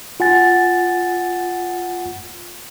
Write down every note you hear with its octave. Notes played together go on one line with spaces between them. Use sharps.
F4 F#5 G#5 A6